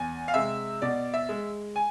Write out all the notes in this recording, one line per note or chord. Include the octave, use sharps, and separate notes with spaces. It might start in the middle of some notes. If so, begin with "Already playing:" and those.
Already playing: E2 G#5
F5
C3 G#3 E5
B2 D5
E5
G#3
G#5